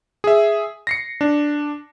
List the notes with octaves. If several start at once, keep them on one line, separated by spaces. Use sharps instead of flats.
G#4 E5
A#6 C7 C#7
D4